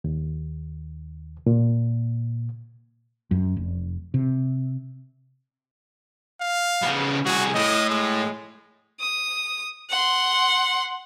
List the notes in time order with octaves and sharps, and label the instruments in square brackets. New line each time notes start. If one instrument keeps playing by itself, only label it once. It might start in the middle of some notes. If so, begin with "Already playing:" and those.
[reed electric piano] D#2
A#2
[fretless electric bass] F#2
F1
C3
[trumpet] F5
[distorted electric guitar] C#3 B3
[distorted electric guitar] C2 G#4 [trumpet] F#4
[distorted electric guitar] A2 [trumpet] D#5
[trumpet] G#3
[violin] D#6
F#5 C6